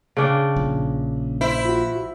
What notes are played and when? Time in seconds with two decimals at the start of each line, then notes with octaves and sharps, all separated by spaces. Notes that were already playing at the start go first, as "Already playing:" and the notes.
0.17 C#3 D4 G5
0.56 A#1
1.41 E4 C5
1.65 F4 F#4